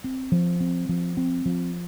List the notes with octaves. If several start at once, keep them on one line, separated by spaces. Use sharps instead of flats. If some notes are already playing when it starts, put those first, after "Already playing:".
C4
F3
C4
F3
C4
F3